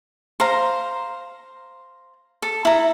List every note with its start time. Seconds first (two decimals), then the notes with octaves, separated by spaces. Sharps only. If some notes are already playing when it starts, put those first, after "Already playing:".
0.40 C5 F5 A#5
2.42 A4
2.65 E4 A#5